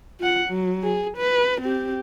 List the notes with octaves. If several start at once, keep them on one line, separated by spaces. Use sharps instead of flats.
F4 F#5
F#3
G#4
B4
C4 G4